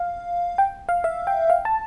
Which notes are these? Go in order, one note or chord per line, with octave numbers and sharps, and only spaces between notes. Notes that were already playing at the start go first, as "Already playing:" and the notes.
Already playing: F5
G5
F5
E5
G5
F5
A5